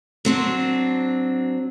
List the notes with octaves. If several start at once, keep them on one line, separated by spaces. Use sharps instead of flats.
F#3 C4 D4